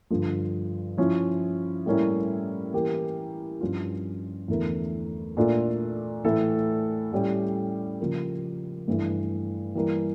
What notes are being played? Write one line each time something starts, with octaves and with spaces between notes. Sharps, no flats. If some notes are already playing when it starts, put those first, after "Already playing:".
G2 D3 F3
F3 C#4 E4
A2 G3 A#3 C#4 E4
E3 A#3 E4 G4 A#4
G2 F3 C#4 F4
E2 D3 A3 E4 A#4
A#2 A3 D4 F4 A4
A2 E3 A3 E4 A4
A2 G3 C#4 G4
C#3 F3 A#3
G2 E3 A3
E3 G3 A#3